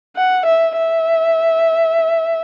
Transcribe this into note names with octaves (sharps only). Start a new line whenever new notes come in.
F#5
E5
E5